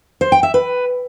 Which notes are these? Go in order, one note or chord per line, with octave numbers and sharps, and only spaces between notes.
C5
G5
E5
B4